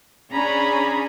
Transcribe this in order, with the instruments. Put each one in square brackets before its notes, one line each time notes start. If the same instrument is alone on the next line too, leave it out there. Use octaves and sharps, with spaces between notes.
[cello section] C#4 D4 G#4 [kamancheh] A#5 B5